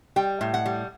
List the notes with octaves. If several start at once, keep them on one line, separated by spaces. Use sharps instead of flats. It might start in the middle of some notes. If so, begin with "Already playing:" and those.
G3 G5
A2
F#5
G3